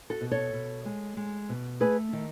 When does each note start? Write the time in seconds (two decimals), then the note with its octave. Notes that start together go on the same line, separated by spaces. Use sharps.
0.10 F#4 A4
0.21 B2
0.31 A4 C#5
0.53 B2
0.85 G#3
1.17 G#3
1.49 B2
1.80 A3 G#4 B4
2.13 D#3